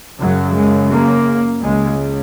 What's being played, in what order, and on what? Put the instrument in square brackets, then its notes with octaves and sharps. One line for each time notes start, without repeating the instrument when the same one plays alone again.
[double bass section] F#2 C#3 F#3
G#3
A#3
C#2 C#3 G#3